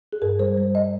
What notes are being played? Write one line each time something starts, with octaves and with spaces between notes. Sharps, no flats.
G#4
G2 A#4
G3 C5
G3 C5
D#5